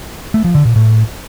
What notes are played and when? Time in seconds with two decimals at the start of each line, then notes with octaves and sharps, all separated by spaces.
0.34 A3
0.44 F3
0.55 D3
0.65 A#2
0.76 A2